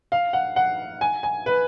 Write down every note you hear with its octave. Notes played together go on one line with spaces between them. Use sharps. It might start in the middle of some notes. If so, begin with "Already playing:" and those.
F5
F#5
F#5
G#5
G#5
B4